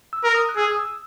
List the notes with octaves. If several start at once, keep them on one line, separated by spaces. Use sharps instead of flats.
E6
A#4
D#6
F#6
G#4 E6
D#6
E6